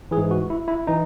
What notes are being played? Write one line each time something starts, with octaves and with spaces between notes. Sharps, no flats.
E3 G#4
G#2
F#4
E4
E4
E3 D#4